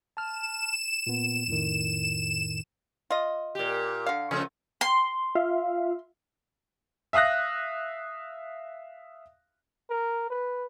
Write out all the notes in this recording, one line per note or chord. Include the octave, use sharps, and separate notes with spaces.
A5 F6 E7
A#2 B3
F2 A2 D#3
F4 D#5
A#2 G4
D3 F5
C#3 F3 A3 C#4
C6
F4 E5 F5
E5 F5 D#6 F#6 A#6
A#4
B4